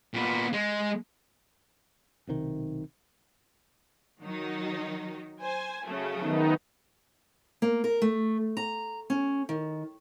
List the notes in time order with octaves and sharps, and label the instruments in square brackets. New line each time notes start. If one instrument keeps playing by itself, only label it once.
[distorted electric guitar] A#2 B3
G#3
[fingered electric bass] B1 C3 D#3
[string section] D#3 F#3 D#4
C5 G#5
C#3 F#3 A3
[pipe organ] D#3 B3 D#4
[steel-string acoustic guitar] A#3
A#4
A3
A#5
C#4
D#3